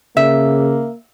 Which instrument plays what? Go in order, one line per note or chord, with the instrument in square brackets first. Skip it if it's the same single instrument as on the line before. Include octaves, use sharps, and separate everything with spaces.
[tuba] C#3 [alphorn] A#3 [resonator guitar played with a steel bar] E5